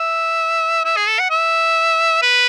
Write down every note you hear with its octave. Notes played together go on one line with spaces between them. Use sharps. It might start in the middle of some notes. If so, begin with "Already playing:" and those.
Already playing: E5
E5
G#4
A4
F#5
E5
B4